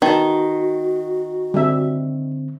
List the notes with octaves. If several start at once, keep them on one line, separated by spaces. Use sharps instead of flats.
D#3 B3 F#4 A5
D3 G3 C4 E5